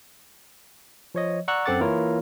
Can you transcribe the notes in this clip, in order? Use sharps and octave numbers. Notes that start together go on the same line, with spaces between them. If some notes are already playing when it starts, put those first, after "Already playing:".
F3 C#5 D#5
D5 F#5 A#5 C#6 E6 F#6
F#2 C4 A4 F#5 D6 A6
E3 A#3 E4 F4 A#4 C#5